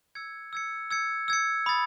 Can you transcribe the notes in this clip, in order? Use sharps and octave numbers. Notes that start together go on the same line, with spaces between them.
E6 G#6 C#7
E6 G#6 C#7
E6 G#6 C#7
E6 G#6 C#7
B5 D#6 A6